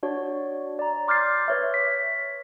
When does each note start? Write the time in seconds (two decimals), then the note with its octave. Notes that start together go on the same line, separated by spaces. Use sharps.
0.03 D4 F#4 C#5 D5
0.79 D5 A#5
1.08 C6 D6 F6 G6 A6 C7
1.48 B4 C#5 E5
1.74 B6